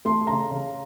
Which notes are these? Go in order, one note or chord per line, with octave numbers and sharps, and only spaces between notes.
A3 C6
C#3 A#5 C6
C#3